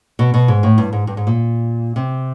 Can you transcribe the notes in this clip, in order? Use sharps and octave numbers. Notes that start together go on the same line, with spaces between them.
B2
B2
G#2
A2
G2
G#2
G2
G#2
A#2
C3